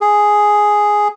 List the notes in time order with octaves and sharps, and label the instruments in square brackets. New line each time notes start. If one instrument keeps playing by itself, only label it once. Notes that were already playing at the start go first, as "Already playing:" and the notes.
[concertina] G#4